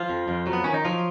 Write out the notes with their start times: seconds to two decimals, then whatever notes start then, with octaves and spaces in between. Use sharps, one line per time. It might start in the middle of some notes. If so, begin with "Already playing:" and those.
Already playing: F3 F4
0.10 F2
0.28 F2
0.47 F#3
0.53 B3
0.64 D#3 C#4
0.74 D#4
0.85 F3 F#3 F4